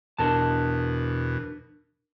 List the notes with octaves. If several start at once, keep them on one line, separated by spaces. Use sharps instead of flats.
E2 B2 D4 A#4 A5